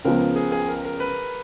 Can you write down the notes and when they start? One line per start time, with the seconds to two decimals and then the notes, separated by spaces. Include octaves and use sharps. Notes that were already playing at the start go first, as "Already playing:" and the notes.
0.04 C#2 C#3 F3 B3 A#4
0.36 G#4
0.52 G#4
0.68 A#4
0.85 A#4
1.00 B4